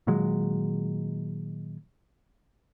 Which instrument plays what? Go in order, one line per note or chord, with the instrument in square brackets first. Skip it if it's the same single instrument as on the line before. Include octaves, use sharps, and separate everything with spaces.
[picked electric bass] A#2 D#3 F#3 G#3